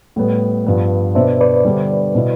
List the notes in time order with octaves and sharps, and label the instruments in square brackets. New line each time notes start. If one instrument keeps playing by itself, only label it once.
[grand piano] A2 G3 B3
G2 F3 B3 D4
[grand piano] B2 B3 D4 [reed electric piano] C5 E5
[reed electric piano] B4 D5
[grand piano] D3 G3 B3 D4
B2 B3 E4